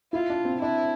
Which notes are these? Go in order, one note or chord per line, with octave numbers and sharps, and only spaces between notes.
E4 F4
D4
C4
D4 E4